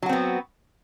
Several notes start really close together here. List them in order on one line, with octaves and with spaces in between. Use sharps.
F#3 F#4 C4 B3